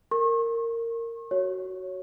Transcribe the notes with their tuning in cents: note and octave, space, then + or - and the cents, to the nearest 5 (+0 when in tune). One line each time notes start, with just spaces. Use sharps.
A#4 -15 C#6 -40
F#4 +10 C#5 +0